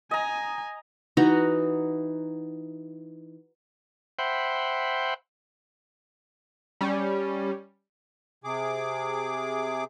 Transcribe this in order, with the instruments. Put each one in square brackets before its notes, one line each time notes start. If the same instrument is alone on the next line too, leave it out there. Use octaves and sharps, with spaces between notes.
[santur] D#5 A#5 [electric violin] G#5
[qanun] E3 D#4 F#4 A#5
[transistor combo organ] C5 E5 F#5 G5 B5 C6
[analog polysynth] G3 C#4
[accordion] C3 G#4 D6